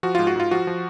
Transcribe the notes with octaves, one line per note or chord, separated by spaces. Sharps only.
F3 F#4
G#2 F4
F#4
G#2 F4
F3 F#4
F3